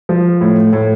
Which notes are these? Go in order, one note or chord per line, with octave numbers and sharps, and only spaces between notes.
F3
A2
A2